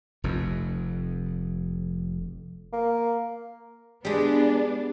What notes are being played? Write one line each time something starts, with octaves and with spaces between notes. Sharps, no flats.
F1 F2
A#3
G3 G#3 B3 D4